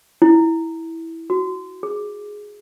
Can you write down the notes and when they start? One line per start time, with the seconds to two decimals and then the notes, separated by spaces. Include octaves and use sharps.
0.22 E4
1.30 F#4
1.83 G#4